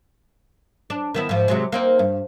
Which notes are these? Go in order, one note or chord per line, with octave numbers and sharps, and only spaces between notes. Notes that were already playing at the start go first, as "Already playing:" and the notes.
D4
D#3 B3 E4
G#2 F3
C3 F#3 G#3
A#3 C4 D#4
G2